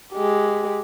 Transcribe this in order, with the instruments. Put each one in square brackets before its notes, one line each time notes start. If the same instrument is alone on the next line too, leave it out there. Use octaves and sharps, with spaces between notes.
[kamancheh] G#3 G4